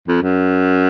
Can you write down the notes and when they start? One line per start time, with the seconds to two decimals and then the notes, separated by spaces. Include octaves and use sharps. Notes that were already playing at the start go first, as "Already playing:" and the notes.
0.08 F2
0.22 F#2